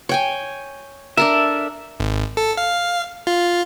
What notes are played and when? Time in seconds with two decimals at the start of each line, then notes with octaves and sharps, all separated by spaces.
0.09 C#5 G5 G#5
1.17 D4 A4 A#4 E5
2.00 G#1
2.37 A4
2.57 F5
3.27 F4